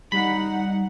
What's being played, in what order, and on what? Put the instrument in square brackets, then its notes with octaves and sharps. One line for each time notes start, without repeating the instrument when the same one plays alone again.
[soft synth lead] G3 [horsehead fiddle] D#4 F#5 [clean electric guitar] B5